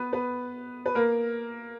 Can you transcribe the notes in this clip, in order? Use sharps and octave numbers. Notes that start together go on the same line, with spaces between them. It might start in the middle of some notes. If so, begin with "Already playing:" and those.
Already playing: B3 B4
B3 B4
B4
A#3 A#4